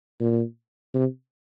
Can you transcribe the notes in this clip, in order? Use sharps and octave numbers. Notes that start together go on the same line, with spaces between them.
A#2
C3